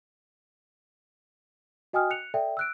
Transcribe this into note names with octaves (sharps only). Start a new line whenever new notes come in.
F#4 D#5 G5 G#5 D#6 F6
F#6 C#7 F7
A4 D5 E5 G5
E6 F#6 D7